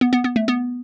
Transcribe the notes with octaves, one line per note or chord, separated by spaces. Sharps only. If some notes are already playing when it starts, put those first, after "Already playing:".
B3
B3
B3
A3
B3